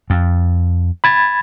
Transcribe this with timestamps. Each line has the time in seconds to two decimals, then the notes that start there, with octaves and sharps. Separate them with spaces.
0.10 F2
1.04 B5 G#6 A6